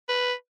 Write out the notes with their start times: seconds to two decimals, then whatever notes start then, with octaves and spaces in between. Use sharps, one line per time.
0.09 B4